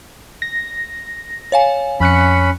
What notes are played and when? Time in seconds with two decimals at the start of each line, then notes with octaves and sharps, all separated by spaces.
0.42 A#6
1.52 C#5 F5 G#5
2.00 F2 C#4 B5 F#6 C#7